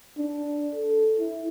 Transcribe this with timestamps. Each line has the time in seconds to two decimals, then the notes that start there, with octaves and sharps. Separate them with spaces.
0.18 D4
0.75 A4
1.19 E4